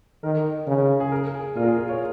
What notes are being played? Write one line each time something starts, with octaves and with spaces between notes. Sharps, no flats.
D#3 A#4
C#3
G#4
A#4
G#4
A#2 F4
A#4
G#4
F4
C#5